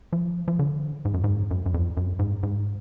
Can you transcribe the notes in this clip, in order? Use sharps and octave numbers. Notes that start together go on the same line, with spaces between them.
F3
F3
D3
G#2
F#2
G#2
F#2
F#2
F2
F#2
G#2
G#2